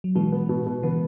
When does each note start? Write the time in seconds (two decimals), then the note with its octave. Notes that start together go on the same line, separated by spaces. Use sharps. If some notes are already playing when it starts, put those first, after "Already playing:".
0.04 F#3
0.15 B2 E3 G#3
0.32 B3
0.49 B2
0.66 B2
0.83 C#3 E3 B3